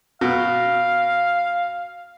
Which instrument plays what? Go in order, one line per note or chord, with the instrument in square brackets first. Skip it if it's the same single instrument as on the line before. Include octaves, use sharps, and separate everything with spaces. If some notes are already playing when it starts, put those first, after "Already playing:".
[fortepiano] B2 [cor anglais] F5